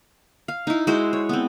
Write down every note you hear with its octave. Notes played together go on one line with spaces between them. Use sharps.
F5
D#4 E4
G#3 E4 F#4 C5
C#5
B3 C4